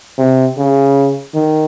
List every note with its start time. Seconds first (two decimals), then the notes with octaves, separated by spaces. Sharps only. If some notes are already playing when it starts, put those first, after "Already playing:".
0.18 C3
0.58 C#3
1.34 D#3